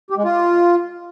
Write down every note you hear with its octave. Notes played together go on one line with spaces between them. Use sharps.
G4
G#3
F4